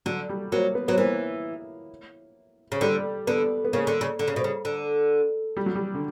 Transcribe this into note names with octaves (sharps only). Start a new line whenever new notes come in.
D3 F#3
G3
F#3 A#3
B3
F#3 B3
E3 A#3
C#3
D3 G3
D3 B3
B3
C#3 A#3
D3
C#3
D3
C#3
B2
C#3
D3
G3
F#3
G3
D3